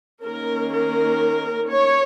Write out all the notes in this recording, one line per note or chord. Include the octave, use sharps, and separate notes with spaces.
D#3 A#3 C#4 A#4
A#4
C#5